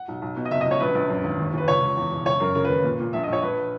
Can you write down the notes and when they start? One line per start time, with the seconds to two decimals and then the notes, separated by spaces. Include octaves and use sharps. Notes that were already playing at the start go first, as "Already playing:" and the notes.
Already playing: F#5
0.08 B1
0.22 B1
0.36 B2
0.45 D#5
0.51 F#1 E5
0.61 D#5
0.66 F#1
0.71 C#5
0.80 A#1 B4
0.95 A#1
1.09 F#2
1.24 G#1
1.39 D#2
1.53 D#2 B4
1.68 C#2 C#5
1.82 C#2
1.97 E2
2.11 E1
2.25 F#1 C#5
2.40 F#2 A#4
2.55 C#3 A#4
2.64 B4
2.69 D#2
2.84 A#2
3.00 A#2
3.13 A#1 E5
3.23 D#5
3.27 A#1
3.33 C#5
3.42 A#1 B4